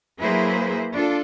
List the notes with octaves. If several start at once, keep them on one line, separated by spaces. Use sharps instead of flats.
F#3 A#3 E4 G#4 B4 C5
D4 F4 A4